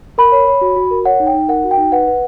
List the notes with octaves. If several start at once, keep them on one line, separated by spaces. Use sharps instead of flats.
A#4 B5
C#5
C#5
F#4
F#4
A#4
C#5 F#5
D#4
G5
D#4
A#4 F#5
F#4
G5
D#4
B4 F#5
B4